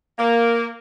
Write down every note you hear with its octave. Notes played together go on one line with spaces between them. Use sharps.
A#3